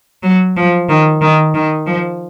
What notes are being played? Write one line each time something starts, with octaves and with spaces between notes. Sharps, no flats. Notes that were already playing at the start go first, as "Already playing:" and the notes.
F#3
F3
D#3
D#3
D#3
F3